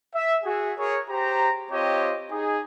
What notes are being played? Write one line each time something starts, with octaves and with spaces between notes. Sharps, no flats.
E5
F#4 G#4
G#4 A#4 C#5
G4 C5 A#5
C4 F4 G4 C#5 D#5
D#4 G#4